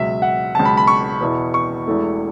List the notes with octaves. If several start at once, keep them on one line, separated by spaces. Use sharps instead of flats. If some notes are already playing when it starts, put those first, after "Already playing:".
Already playing: C#2 B2 F#3 E5
F#5
C#2 B2 F#3 A5
B5
B5
C#6
E2 B2 B3 E4
C#6
E1 E2 E3 A3 E4